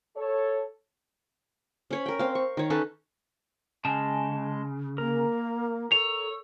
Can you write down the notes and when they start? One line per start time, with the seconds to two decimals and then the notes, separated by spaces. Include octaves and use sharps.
0.17 A4 C#5
1.91 C#4 C#5 B5
2.06 A#4 G5
2.19 C4 F5
2.35 C#6
2.57 D#3 C#5
2.70 C#4 D#4 A4 B4
3.85 C#3 G#3 A5
4.98 A#3 A#4
5.92 A4 C#5 F7